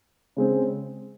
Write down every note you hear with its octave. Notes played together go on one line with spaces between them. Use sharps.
C#3 G#3 C4